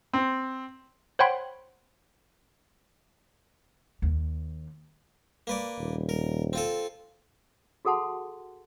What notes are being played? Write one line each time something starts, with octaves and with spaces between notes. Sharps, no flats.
C4
C5 C#5 F#5 G5 B5 C6
D#2
A#3 B4 D5
D#1
A#4
C4 F4 A4
F#4 G#4 A4 F#5 A5 C6